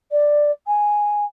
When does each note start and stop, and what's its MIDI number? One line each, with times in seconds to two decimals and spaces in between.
0.11 0.50 74
0.66 1.24 80